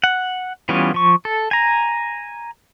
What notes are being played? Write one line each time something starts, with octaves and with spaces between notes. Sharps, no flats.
F#5
E3 G3 B3 C#4 F4
F3 C#6
A4
G#5 A#5